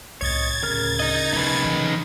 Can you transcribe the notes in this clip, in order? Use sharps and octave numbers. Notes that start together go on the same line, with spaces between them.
C2 A2 C#5 D#5 G#6 A6
D1 C#3 A#4 F6
D#4 D#5
B2 D#4 B4
E3